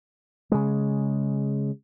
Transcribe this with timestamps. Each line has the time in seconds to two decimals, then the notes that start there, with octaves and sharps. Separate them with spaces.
0.52 C#3 G#3